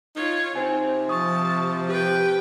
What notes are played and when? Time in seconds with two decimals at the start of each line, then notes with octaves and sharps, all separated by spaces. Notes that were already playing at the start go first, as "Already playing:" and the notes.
0.16 D#4 F4 C#5
0.55 C3 C4 D#4 C5 G#5
1.09 F3 A5 C#6 D#6
1.89 G4 B4 G5